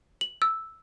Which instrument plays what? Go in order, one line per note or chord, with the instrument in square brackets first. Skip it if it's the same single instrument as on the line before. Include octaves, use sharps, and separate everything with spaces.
[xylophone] F#7
E6